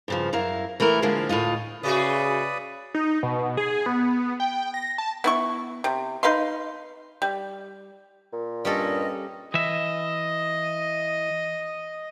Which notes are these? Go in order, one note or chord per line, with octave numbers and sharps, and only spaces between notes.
G2 C#3 F3
F#2 E4 A#4 F5
E3 A3 E4 A#4
D3 F3 G#3 A#3
D2 A2 C#3 F4 D#5
C#3 A3 F#4 G#4 B4 D5 D#6
D#4
B2
G#4
B3
G5
A#6
A5
B3 E4 C#6
C3
D#4 B4 F5 C6
G3
A#2
G2 G3 C#4 A4 D#5
E3 D#5 E5